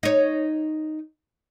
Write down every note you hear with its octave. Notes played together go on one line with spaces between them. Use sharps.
D#4 C#5